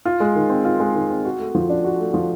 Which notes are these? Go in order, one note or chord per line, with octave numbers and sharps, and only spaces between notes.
F4
G#3
D#3
C4
F4
G#3
D#3
C4
F#4
A3
F3
D4
F#4
A3
F3